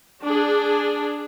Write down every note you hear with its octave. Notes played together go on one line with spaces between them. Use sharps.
D4 G#4